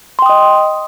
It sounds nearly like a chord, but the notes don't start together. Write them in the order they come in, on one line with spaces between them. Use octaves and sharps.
C6 G5 D#6 D#5